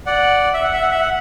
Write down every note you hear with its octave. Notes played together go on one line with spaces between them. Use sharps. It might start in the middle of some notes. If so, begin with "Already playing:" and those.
D5 F#5
E5
F#5
E5
F#5
E5
F#5